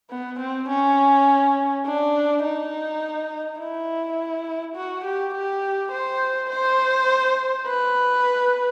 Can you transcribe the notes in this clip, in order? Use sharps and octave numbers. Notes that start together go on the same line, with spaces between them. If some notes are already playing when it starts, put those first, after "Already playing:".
B3
C4
C#4
D4
D#4
E4
F#4
G4
G4
C5
C5
B4